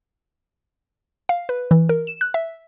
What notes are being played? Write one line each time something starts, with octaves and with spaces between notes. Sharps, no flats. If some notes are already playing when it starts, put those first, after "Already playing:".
F5
B4
E3
A#4
E7
F#6
E5